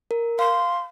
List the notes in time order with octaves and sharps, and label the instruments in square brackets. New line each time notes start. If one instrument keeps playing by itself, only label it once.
[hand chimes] A#4
[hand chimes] F5 [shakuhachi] C6